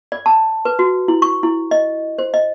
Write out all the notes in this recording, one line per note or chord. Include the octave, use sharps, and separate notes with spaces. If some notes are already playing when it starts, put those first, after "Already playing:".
D5
A5
B4
F#4
E4
C#6
E4
D#5
C5
D#5